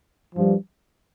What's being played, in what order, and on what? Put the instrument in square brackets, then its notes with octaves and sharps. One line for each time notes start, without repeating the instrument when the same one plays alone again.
[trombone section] G2 F3